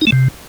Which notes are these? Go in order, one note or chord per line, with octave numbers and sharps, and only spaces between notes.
D#4
A3
C3